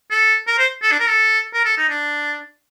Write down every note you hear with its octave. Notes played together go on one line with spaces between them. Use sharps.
A4
A#4
C5
A4
D4
A#4
A4
A#4
A4
D#4
D4